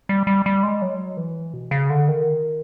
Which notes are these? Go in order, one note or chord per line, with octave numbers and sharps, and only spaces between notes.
G3
G3
G3
G#3
F#3
E3
B2
C#3
D3
D#3